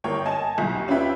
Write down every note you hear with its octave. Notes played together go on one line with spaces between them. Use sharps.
G1 A#4 C#5 G5
D#5 G#5 A5
B1
D#2
C#4 D4 F4 B4 E5 G5